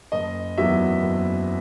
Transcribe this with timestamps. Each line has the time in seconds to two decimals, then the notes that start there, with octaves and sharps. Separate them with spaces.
0.12 F#1 D#5
0.58 E2 D#3 F#3 B3 E5
1.02 F#1